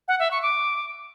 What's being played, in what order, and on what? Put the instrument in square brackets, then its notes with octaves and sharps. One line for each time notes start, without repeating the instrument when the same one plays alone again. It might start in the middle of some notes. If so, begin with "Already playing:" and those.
[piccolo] F#5
E5
C#6
D6